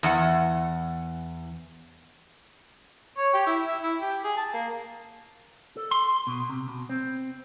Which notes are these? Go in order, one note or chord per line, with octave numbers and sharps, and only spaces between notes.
E2 F#5
C#5
G4
E4
E5
E4
G4
G#4
A5
A#3
A4
C6
B2
C3
B2
C4